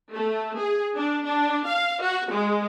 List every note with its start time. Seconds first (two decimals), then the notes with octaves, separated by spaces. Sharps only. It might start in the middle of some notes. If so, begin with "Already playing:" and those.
0.13 A3
0.58 G#4
0.96 D4
1.26 D4
1.67 F5
2.02 F#4
2.31 G#3